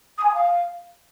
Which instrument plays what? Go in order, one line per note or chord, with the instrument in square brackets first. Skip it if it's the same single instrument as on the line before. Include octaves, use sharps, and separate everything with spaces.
[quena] D#6
G#5
D#6
F5